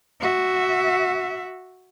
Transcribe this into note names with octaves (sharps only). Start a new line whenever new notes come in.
F#4 E5